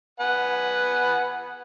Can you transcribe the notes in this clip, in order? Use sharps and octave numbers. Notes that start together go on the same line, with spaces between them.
B4 F#5 G#5